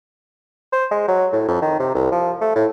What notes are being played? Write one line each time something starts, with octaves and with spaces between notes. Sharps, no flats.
C5
G#3
F#3
A2
F2
D#3
C3
C2
F3
A3
A2